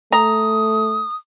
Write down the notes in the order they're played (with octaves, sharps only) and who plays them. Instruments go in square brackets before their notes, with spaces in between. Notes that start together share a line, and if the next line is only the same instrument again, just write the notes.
[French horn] A3 [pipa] A#5 [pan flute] D#6